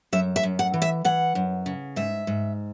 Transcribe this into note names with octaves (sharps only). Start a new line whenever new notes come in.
F#2 E5
E5
F#2
F#5
E3
E5
E3 F#5
F#2
C#3
G#2 E5
G#2